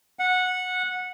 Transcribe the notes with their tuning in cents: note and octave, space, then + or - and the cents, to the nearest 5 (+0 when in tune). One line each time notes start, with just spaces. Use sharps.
F#5 -15